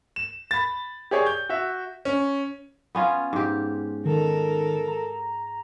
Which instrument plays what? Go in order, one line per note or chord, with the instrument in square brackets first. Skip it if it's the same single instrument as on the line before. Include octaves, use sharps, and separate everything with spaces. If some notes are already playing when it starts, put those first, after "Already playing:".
[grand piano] E7
B5 A6
G4 G#4 C#5 D5
G6
F#4 E5
[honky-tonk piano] C#4
[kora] B3 C#4 F4
G#2 G4
[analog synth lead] D#3 [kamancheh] A4 A#4
[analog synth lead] A#5